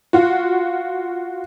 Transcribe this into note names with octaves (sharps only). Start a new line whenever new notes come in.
F4 F#4